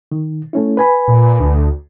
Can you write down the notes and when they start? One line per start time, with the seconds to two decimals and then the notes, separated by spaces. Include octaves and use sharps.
0.12 D#3
0.53 A3 C#4 E4
0.77 B4 G#5 B5
1.08 A#2
1.40 D2